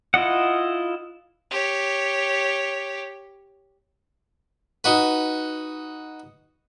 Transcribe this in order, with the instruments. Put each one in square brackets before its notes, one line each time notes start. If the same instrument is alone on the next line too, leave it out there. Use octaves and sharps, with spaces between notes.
[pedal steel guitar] E4 F4 D#5 F#5
[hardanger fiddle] G4 C#5
[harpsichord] D#4 F#4 B4